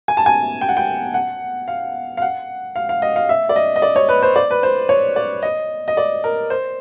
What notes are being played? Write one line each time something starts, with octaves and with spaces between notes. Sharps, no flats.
G#5
A5
G#5
G5
F#5
G5
F#5
F5
F5
F#5
F5
F5
D#5
F5
E5
D5
D#5
D#5
D5
C#5
B4
C5
D5
B4
C5
C#5
D5
D#5
D#5
D5
A#4
C5